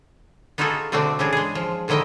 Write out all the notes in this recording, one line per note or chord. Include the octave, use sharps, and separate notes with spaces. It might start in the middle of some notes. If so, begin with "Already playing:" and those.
B3 D#4 F4 F#4 G#4 A4
B2 D3 A3 C4 D4 D5
C#3 E3 G3 D4 G#4
G#3 G#4
F3
A2 D3 D#3 E4 D#5 G5